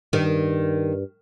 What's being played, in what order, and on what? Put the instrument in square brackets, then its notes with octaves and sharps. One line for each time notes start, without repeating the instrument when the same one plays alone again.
[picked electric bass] G2 [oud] D#3